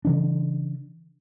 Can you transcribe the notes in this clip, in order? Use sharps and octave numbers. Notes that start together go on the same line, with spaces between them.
C#3 E3 D4